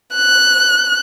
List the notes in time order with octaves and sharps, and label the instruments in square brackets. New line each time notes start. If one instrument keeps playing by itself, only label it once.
[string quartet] F#6